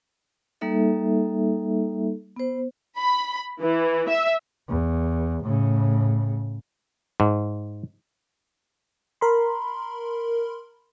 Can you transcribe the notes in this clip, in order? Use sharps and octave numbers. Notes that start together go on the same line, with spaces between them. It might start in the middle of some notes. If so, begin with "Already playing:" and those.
G3 A#3 D#4 A4 E5
B3 C5
B5
E3
E5
E2
A2 C#3
G#2
A#4 B5 C6